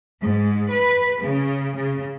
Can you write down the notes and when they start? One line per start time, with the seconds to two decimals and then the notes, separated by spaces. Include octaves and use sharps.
0.21 G#2
0.70 B4
1.22 C#3
1.76 C#3